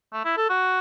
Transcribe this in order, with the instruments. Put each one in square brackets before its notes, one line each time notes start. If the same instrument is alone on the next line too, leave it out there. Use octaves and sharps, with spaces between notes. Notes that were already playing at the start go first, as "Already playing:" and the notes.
[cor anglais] A3
E4
A4
F#4